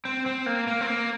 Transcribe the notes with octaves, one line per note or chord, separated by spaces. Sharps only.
C4
C4
A#3
A#3
C4
A#3